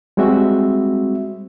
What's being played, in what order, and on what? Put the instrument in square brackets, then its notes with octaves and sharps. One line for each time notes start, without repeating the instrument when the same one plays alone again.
[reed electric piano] G3 G#3 C4 F#4 E5